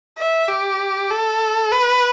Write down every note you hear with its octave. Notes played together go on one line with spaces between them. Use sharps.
E5
G4
A4
B4